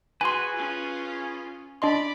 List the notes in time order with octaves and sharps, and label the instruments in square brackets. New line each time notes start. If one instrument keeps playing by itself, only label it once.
[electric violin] F#4 [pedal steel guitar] G#4 B4 [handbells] G#5 C6
[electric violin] C#4 F4
[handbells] D4 D#5 C6 [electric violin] D5 B5